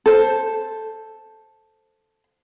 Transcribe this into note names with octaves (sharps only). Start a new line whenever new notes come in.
A4 C5